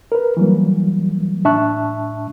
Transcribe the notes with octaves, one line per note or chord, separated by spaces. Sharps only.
A#4 B4
E3 F#3 G3 A#3
A2 D4 E5 A5 C#6 F#6